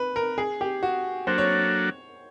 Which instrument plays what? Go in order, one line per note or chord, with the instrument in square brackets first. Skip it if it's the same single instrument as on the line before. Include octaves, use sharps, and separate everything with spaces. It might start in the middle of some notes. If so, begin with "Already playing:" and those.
Already playing: [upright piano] B4
A#4
G#4
G4
F#4
[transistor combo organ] F#3 A#3 D4 F#4 A4 [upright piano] C5
[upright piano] C#5